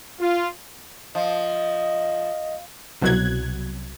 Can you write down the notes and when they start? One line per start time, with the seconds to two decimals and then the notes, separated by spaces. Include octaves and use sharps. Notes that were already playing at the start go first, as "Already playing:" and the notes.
0.20 F4
1.15 F3 D#5
3.02 C2 B2 F#3 F#6 G#6